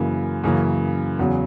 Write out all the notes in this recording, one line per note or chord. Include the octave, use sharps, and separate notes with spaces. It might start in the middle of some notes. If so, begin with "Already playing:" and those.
Already playing: F#2 C#3 E3 A#3
F#2 C#3 E3 A#3
E2 C#3 F#3